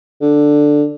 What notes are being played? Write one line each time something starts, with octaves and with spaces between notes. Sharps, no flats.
D3